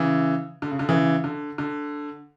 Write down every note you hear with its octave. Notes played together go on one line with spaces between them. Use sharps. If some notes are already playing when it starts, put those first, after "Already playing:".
Already playing: C#3 E3
D3
C#3
D3
C#3 E3
D3
D3